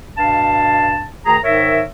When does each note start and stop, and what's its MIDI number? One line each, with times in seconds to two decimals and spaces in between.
0.17 1.05 43
0.17 1.05 47
0.17 1.05 77
0.17 1.05 81
1.26 1.38 38
1.26 1.38 51
1.26 1.38 68
1.26 1.38 82
1.44 1.83 44
1.44 1.83 51
1.44 1.83 70
1.44 1.83 73
1.44 1.83 76